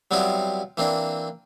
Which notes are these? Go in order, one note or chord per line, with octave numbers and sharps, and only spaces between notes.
F#3 G3 B3 C4 E4 F4
E3 A#3 C4 D4